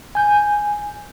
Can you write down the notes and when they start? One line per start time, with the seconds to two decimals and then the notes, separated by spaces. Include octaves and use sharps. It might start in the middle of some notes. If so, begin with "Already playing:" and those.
0.15 G#5 G6